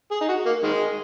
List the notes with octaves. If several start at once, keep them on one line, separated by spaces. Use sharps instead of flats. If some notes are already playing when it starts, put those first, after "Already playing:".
G#4
D#4
F#4
A#3
D#3 G#3